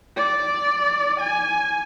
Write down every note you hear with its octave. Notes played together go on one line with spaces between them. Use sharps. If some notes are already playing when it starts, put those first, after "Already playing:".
D5
G#5